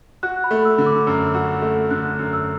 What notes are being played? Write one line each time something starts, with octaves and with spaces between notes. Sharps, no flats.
F#4 F#6
B5
A3
E6
D3
D6
F#2 E6
E6
F#4
E6
A3
D3 F#6
F#2
E6